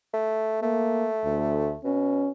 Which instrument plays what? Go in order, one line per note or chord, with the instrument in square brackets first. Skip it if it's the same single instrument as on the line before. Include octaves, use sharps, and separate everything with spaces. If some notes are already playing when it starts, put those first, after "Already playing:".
[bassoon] A3
[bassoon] A3 [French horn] A#3
[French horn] D2
[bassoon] B2 [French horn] C#4